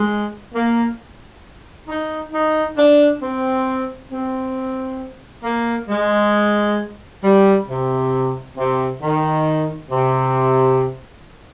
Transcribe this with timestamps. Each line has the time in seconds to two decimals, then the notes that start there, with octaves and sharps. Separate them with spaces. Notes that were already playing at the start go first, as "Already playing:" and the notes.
Already playing: G#3
0.54 A#3
1.88 D#4
2.33 D#4
2.77 D4
3.21 C4
4.11 C4
5.44 A#3
5.88 G#3
7.23 G3
7.68 C3
8.56 C3
9.02 D#3
9.90 C3